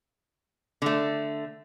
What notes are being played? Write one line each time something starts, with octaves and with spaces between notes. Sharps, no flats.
D3 A3